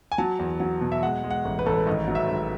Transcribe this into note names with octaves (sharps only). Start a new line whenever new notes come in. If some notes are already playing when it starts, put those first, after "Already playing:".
G#5
F#3 A5
E2
F#3
B2
E5
G#3 F#5
G#3
F#5
A1
B4
A1 A4
B4
G#1 D#5
F#3
E5
G#1